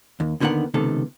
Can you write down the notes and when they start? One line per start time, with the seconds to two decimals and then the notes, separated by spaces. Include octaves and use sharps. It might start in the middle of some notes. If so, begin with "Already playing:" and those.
0.20 D#2
0.40 D#2 D3 D#3 B3 A#4 F#5
0.74 C#2 C3 D#3 B3 A4